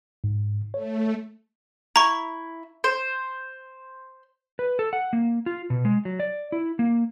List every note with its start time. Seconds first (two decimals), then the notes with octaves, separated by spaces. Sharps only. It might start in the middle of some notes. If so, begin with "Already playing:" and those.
0.24 G#2
0.74 A3 C#5
1.96 E4 A#5 C#6
2.84 C5
4.59 B4
4.79 A4
4.93 F#5
5.13 A#3
5.46 F4
5.70 B2
5.85 G#3
6.05 F#3
6.20 D5
6.52 E4
6.79 A#3